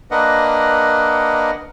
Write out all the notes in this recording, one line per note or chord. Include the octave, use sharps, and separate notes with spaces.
A#3 D4 A#4 B4 D#5 F#5